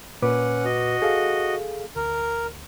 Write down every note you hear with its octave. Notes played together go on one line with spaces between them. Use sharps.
A#2 C#4 B4 F#5 D6
F#4 D#5
G#4 A4 F5
D2 A#4